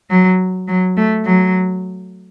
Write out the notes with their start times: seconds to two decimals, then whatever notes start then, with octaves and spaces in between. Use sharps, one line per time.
0.10 F#3
0.68 F#3
0.97 A3
1.26 F#3